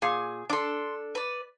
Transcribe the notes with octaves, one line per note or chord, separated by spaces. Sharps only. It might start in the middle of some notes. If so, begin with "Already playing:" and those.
A#2 G#4
D4 A4 C6 D6
B4 D5